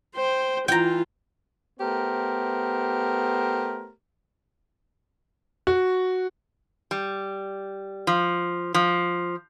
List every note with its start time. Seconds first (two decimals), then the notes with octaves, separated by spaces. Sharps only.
0.16 C5 G5
0.68 E3 F4 G5 A#5
1.80 A3 B3 G4 A#4 C5
5.67 F#4
6.91 G3
8.07 F3
8.74 F3